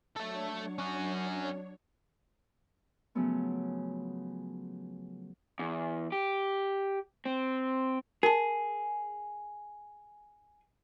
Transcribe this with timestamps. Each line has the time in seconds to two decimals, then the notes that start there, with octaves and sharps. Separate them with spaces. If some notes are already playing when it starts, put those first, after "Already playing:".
0.16 F#3 A3 D4 A4 C#5
0.78 C#4 F#4
3.15 C#3 F3 F#3 A3 B3 C#4
5.59 E2
6.12 G4
7.26 C4
8.23 G#4 A#4 A5